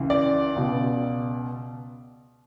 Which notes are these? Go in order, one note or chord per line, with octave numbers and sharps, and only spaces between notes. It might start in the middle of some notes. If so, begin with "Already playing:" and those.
Already playing: C#2 C#3 E3
D5
C#2 B2